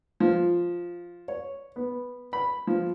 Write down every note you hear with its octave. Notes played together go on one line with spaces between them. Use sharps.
F3
C#5
B3
B5
F3